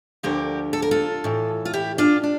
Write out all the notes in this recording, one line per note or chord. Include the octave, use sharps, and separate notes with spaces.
D2 D3 F3 G4 A#4
A4
A#4
F4 A4
A2 E3
F4
E4 G4
D4 F4
D4